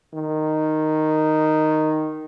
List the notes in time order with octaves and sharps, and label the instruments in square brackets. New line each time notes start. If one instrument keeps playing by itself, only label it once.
[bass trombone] D#3